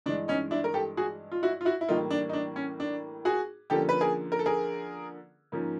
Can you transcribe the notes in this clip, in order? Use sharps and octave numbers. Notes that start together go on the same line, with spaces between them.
G2 E3 G#3 D4
C#4 D#4
D4 E4
A#4
G4 A4
F#4 G#4
F4
E4 F#4
F4
E4 F#4
E4
A2 E3 G3 A#3 D#4 F4
D4
D#4
D4
C#4
D4
F#4 G#4
D3 F3 A#3 C#4 G4 A4
B4
G#4 A#4
A#4
A4
G#4 A#4
G#2 F3 A#3 C#4